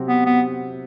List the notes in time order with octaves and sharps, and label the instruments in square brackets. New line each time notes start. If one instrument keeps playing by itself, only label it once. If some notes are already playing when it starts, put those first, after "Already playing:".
Already playing: [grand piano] C3 F#3 C4 F#4 G4
[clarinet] B3
B3